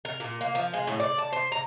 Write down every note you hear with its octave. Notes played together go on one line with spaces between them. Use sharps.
A#4
A#2
A#3
F3
G#3
A2
D5
A5
C5
A#5